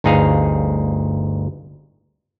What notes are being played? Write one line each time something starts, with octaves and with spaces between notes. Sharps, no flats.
G1 D2 D#4 G#4 F5